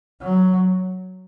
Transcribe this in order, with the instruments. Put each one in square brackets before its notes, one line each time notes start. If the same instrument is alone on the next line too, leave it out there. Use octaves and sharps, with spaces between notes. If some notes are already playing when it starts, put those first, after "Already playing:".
[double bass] F#3